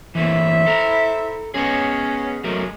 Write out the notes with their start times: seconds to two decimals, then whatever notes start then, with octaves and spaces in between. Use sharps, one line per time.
0.15 E3 A3 A#3 E4 C5 E5
0.66 A4 A#5
1.54 B3 C#4 G#4 D#5 F#5
2.44 F#3 G#3 A3 A#4